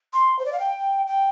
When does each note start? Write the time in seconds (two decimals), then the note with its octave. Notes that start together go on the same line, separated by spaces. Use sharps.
0.13 C6
0.39 C5
0.45 D5
0.52 F5
0.60 G5
1.07 G5